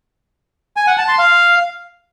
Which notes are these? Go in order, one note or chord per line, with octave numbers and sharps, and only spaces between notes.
G#5
F#5
A5
C6
F5